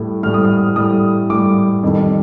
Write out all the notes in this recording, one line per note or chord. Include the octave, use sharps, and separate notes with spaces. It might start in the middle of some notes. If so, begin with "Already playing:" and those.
Already playing: A2 G3
A2 G3 F6
D#6
F6
A2 G3 D#6
A2 G3 D6
F2 D#3 G3